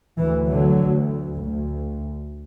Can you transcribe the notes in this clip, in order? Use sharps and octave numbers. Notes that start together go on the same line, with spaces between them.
D2 E3
D3 F#3
D2
D2